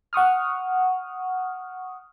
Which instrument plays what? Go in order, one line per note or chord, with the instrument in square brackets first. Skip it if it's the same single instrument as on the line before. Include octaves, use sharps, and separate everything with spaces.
[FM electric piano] F#5 C#6 D#6 F6